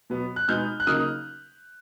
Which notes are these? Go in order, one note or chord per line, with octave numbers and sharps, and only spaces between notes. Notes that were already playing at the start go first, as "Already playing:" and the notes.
B2 F#3 B3
F#6
B2 G#3 B3 D#4 F6 G6
F#6
C#3 F#3 A#3 D#4 D#6 F6